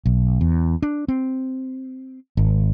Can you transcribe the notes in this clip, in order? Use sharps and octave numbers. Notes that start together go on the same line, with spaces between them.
B1
E2
D4
C4
G#1